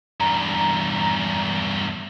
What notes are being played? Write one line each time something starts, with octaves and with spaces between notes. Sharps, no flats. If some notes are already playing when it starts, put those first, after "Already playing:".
E2 G2 A#5